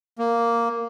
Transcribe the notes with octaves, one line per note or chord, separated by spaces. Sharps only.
A#3